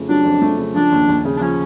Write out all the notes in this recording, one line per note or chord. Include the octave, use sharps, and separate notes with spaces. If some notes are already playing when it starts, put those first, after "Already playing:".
Already playing: F2 C#3 A3
F#3 D4
F2
A3
C#3
F3 D4
D#2
D#2
C#3
D4
F3 C#4